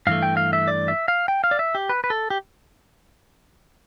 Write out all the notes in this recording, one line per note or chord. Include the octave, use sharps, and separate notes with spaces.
G2 E3 A3 F5
G5
F5
E5
D5
E5
F5
G5
F5
D5
E5
G4
B4
B4
A4
G4